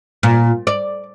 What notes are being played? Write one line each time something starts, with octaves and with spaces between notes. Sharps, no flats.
A#2
D5